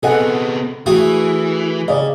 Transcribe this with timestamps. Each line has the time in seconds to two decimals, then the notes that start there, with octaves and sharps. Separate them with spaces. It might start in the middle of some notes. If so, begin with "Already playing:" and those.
0.03 C3 B3 G#4 A4 D#5 F#5
0.86 E3 A3 F#4 G#4
1.88 C#3 D5 D#5